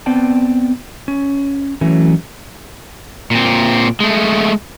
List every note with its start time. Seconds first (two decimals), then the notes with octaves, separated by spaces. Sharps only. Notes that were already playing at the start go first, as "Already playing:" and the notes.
0.06 B3 C4 D5 G5 A5
1.08 C#4
1.81 E3 F#3 A3 C#4
3.31 A#2 C4
4.00 G#3 A3